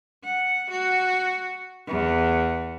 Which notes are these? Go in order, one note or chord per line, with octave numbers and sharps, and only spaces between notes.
F#5
F#4
E2